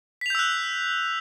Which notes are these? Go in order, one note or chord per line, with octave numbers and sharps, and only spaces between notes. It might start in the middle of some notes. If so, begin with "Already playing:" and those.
E6 F#6 G6 B6 F7